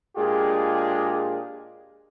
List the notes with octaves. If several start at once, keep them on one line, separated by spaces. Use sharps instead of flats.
A#2 G#3 D4 F4 G4 G#4